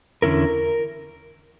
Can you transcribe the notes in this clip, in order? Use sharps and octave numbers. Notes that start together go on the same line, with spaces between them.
E2 D3 A3 C#4 E4 A#4